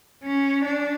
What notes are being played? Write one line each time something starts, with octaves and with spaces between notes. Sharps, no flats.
C#4
D4